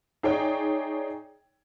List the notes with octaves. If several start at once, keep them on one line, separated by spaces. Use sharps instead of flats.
D#4 G#4 C#5 D5 G5